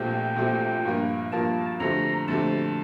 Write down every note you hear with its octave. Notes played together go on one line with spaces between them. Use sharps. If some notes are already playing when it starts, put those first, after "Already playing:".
Already playing: A#1 A#2 A3 C4 G4 G5
A#1 A#2 A3 C4 G4
G2 F3 A#3 F4 A#4
G2 F3 A#3 F4 A#4 A5
F2 D3 A3 C4 G4 A#5
F2 D3 A3 C4 G4 A5